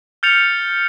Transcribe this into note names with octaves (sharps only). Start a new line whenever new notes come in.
F6 G6 A6 C#7 F7